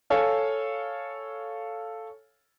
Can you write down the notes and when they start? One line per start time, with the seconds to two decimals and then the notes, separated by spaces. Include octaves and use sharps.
0.10 A4 C#5 F5 G#5